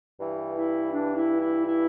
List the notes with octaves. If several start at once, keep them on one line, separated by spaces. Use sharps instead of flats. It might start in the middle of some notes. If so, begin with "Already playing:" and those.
G2 E3
E4
D4
E4
E4
E4